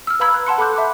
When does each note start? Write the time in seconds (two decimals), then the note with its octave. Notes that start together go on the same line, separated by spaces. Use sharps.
0.07 E6 F6
0.20 B4 F5 A#5 B5 E6 G#6
0.34 F#6
0.47 F#5 A5 C6 C#7
0.58 A4 B5 C6 D6 F#6 G6
0.76 E5 B5 D6